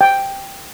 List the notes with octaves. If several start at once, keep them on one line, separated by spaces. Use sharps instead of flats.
G5